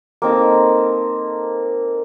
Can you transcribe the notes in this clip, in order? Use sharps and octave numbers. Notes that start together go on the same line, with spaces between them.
A#3 C4 D#4 A4